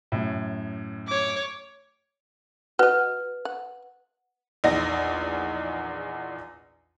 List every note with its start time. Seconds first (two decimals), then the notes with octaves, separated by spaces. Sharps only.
0.12 F#2 A2
1.07 C#5 D6
2.79 F#4 B4 D#5
3.45 F#5
4.64 A#1 E2 D#4 A#6